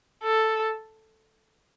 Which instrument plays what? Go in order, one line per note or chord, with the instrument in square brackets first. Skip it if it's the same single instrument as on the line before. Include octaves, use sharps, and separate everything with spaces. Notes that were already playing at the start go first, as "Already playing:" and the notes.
[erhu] A4